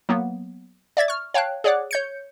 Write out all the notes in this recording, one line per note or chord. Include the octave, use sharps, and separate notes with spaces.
F#3 A#3 B3
D5 E5 G#6 A6
C#6 F6
C#5 F5 G5 A5 F#6
G#4 C#5 D5 F#5 D6 F#6
C#5 G6 C#7